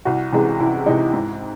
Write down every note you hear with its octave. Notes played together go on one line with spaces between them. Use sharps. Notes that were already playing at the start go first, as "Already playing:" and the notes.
C2 F#4
C3 E3 G#3
C2 E4
C3 E3 G#3 D#4
G#2 E4